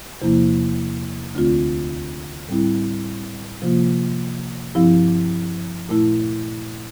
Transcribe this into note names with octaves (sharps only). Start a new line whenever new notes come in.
E2 C3 F3 A#3 E4
D2 D3 A3 C4 F4
A2 G3 C4 E4
C3 F3 A#3 F4
G2 F3 C4 E4
A#2 A3 E4